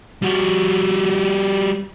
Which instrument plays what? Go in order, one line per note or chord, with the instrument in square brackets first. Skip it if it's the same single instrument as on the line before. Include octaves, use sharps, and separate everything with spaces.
[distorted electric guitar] G3 F#4